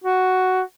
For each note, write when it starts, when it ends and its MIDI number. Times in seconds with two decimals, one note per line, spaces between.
0.04 0.62 66